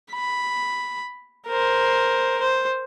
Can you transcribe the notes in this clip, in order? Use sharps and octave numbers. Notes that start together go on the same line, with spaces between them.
B5
A#4 C5
C5